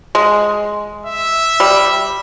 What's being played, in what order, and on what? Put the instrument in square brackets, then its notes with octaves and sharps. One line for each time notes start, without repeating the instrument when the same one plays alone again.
[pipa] G#3
[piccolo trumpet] E5
[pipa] G3